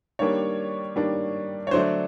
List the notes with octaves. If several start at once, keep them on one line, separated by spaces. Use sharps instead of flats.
D#3 G3 A#3 D4 C#5
D#3 G3 A#3 D4
C#5
D3 F#3 A3 D4 C5